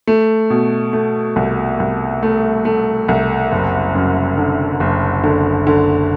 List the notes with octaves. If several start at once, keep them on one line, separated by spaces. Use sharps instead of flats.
A3
B2
A3
C2
C2
A3
A3
C2
F#1
F#2
D3
F#1
D3
D3